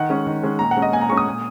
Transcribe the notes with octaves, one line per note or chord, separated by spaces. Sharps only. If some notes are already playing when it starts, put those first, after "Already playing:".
Already playing: D#3 F#5
G#3 C#4
D#3
G#3 C#4
A#2 A#5
F#5
G#3 C#4
D#5
A#2 G#5
A#5
G#3 C#4 C#6
D#6
A#2